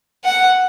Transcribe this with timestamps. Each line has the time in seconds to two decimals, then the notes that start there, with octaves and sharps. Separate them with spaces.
0.24 F#5